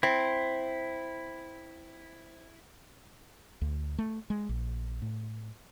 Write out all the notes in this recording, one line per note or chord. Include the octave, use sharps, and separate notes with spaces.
C4 E4
D2
A3
G#3
A#1
A2